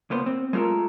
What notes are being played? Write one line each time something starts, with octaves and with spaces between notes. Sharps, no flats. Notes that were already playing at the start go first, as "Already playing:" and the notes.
C#2 A#3 B3 C5
C4
G#3 A3 F4 A4 A#4